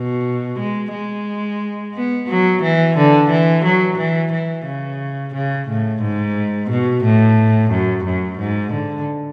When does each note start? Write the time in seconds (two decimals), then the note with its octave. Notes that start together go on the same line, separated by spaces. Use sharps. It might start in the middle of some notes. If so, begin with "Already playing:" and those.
Already playing: B2
0.59 G#3
0.94 G#3
1.95 B3
2.28 F#3
2.62 E3
2.97 D3
3.30 E3
3.65 F#3
3.98 E3
4.32 E3
4.65 C#3
5.34 C#3
5.68 A2
6.02 G#2
6.70 B2
7.04 A2
7.71 F#2
8.05 F#2
8.38 G#2
8.73 D3